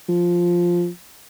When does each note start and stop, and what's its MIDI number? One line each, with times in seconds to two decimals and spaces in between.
0.09 0.89 53